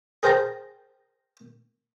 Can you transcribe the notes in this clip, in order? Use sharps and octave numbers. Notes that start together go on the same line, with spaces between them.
G#4 A#4 C5 G5 A5 A#5